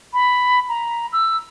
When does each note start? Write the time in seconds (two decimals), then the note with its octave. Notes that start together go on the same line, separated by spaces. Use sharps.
0.13 B5
0.69 A#5
1.13 E6